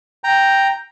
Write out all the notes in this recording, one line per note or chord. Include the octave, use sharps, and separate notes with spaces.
G5 A#5